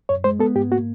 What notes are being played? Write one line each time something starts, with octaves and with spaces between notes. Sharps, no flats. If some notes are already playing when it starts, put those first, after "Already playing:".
F#2 C#5
G#3 C5
B3 A4
G#2 G4
A#3 F#4